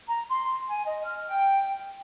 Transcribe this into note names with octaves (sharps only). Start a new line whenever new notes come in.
A#5
C6
G#5
D#5
F6
G5